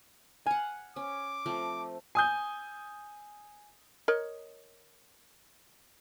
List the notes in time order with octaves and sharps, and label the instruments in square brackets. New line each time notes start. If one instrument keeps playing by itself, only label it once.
[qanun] F5 F#5 [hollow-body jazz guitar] G#5
[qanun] C#4 [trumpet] D6
[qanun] F3 A3 C4
[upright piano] G#5 D#6 G6
[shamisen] A#4 C#5 D#5